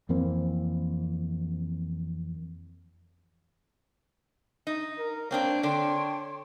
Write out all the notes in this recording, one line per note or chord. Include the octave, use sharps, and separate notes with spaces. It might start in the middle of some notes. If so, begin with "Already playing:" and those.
F2 E3 A#3 C4
D#4
A#4
A#3 C4 D4 C#5 G5
D3 D4 G5 C6